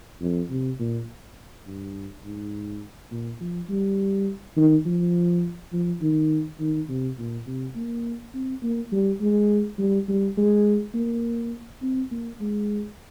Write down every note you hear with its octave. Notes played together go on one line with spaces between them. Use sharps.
F2
C3
A#2
G2
G#2
A#2
F3
G3
D#3
F3
F3
D#3
D#3
C3
A#2
C3
A#3
C4
A#3
G3
G#3
G3
G3
G#3
A#3
C4
A#3
G#3